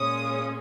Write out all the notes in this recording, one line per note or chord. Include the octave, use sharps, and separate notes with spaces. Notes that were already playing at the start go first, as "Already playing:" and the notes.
Already playing: A#2 G#3 C#4 D#6